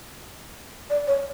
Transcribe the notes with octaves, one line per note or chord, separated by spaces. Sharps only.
D5
C#5